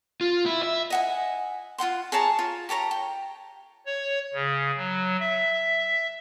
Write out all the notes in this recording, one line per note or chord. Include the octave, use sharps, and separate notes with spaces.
F4
E4
E5
D#5 F#5 G#5
F4 F#4 F#5 C6
G#4 C#5 A5 A#5
F4
G4 A4 C#5 A#5
G5
C#5
C#3
F#3
E5